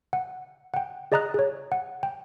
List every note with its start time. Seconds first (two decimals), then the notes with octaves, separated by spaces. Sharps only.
0.13 F#5
0.74 F#5 G5
1.12 G#4 D5 D#5 A#5 D#6 F#6
1.34 G#4 C#5
1.72 F#5
2.03 G5